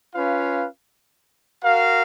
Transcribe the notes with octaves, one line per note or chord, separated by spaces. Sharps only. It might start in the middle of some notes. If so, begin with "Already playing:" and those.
C#4 F4 B4 F5
F#4 A#4 F5